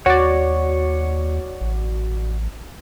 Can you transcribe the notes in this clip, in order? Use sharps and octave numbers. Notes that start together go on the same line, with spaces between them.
D#2 F#4 C#5 D5
A1